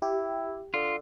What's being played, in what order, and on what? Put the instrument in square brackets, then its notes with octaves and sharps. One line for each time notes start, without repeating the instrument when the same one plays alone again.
[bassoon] E4 [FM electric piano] G4
[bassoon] D3 [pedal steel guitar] F4